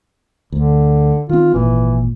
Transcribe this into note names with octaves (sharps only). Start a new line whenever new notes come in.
D2 D3
D#3 C4 F4
G#1 A#2 E3